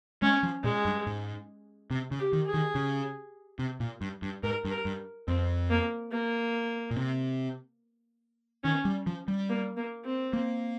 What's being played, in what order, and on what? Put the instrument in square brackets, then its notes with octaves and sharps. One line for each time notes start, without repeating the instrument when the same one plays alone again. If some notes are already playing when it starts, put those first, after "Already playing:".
[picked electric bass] G#3 [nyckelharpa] C#4
[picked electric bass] F3
[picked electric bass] A#2 [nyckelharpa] G#3
[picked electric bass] G2
G#2
C3
C#3
[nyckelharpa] G4
[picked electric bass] D#3
[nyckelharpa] G#4
[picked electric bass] D#3
C#3
C3
A#2
G2
G2
[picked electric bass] G#2 [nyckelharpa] A#4
[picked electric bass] G2
[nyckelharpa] A#4
[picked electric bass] G2
[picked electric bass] F2 [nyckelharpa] C4
[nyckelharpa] A#3
A#3
[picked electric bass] A#2
C3
[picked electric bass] D#3 [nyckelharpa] C#4
[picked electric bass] G3
F3
G3
[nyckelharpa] A#3
A#3
C4
[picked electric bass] A#3